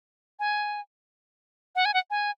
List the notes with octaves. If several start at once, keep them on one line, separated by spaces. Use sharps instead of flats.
G#5
F#5
G#5
F#5
G#5